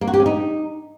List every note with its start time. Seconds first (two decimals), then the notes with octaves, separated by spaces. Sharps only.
0.01 A#3
0.07 F#4
0.14 G4
0.20 C#4
0.26 D#4